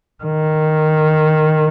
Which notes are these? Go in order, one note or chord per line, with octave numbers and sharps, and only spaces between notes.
D#3